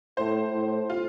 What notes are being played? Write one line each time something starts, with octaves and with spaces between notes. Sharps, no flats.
A2 C5
A2
F4